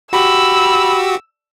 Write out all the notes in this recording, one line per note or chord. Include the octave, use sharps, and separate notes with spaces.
F#4 G4 B5 E6